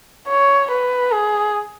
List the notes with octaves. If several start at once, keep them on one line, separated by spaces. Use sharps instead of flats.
C#5
B4
G#4